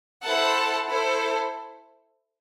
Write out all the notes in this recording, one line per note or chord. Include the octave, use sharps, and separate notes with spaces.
E4 A4 C5 F#5 A5
E4 A4 C5